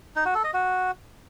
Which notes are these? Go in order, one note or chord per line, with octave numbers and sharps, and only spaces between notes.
D#4
F#4
A4
D#5
F#4